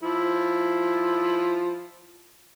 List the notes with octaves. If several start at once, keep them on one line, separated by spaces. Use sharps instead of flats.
F3 E4